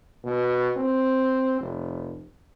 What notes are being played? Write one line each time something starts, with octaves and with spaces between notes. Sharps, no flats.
B2
C4
F1